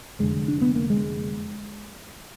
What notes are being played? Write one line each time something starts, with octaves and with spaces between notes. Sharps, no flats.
F1 F2 D3 G#3
D4
B3
A#3
G#3